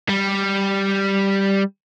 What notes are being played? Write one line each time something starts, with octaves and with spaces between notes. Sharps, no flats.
G3